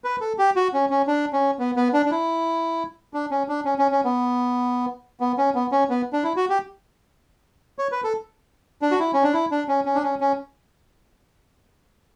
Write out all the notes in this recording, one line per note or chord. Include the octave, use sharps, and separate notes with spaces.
B4
A4
G4
F#4
C#4
C#4
D4
C#4
B3
B3
D4
D4
E4
D4
C#4
D4
C#4
C#4
C#4
B3
B3
C#4
B3
C#4
B3
D4
E4
F#4
G4
C#5
B4
A4
D4
F#4
E4
C#4
D4
E4
D4
C#4
C#4
D4
C#4
C#4